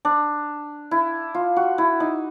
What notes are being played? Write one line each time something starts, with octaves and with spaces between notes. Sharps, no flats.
D4
E4
F4
F#4
E4
D#4